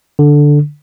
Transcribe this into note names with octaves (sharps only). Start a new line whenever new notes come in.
D3